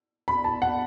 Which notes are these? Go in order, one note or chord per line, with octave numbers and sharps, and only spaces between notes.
B5
A5
F#5